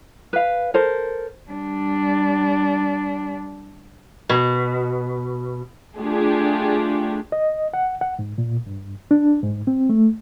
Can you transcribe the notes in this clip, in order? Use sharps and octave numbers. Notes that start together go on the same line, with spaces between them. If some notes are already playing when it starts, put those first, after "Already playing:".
B4 F5
A4 A#4 C5
G3 D4
B2
A3 D4 F4 G4 G#4
D#5
F#5
F#5
G#2
A#2
G2
D4
G#2
C4
A3